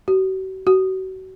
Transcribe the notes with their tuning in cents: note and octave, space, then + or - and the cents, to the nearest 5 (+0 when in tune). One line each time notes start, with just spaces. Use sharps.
F#4 +40
F#4 +35